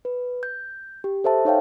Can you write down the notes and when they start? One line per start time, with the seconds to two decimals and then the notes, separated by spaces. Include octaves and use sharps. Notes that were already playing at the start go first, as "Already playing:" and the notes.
0.05 B4
0.43 G6
1.04 G4
1.24 A4 C5 E5 A5
1.45 D#4 C#5 F5 G5